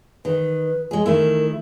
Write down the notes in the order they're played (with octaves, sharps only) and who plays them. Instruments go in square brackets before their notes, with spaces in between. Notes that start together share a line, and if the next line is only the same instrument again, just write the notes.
[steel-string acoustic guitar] D#3 [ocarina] B4
[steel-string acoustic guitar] G#3 G#4
[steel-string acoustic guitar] D#3 A3 E4 [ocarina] A#4